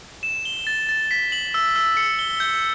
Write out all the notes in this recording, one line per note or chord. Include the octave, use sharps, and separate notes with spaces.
E7
G7
A6
A6
B6
F#7
E6
E6
C#7
G7
G6